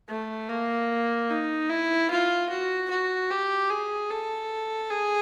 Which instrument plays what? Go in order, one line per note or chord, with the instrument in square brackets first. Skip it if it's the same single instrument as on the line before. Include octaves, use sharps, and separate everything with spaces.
[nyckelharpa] A3
A#3
D#4
E4
F4
F#4
F#4
G4
G#4
A4
G#4